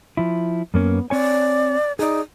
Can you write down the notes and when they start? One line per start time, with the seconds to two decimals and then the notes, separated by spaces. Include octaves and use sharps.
0.17 F3 E4
0.74 F#2 A#3 B3 C#4
1.10 C4 C#5 D5 G#5
1.99 D#4 G#4 D5